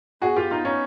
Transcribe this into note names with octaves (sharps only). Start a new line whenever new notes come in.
B3 F#4 G#4
F4 G4
D#4 F4
C#4 D#4